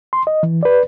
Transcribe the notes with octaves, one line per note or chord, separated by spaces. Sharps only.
C6
D#5
E3
B4 D5